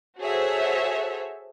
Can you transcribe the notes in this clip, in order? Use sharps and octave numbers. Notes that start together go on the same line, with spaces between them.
F#4 G#4 A4 C5 C#5 E5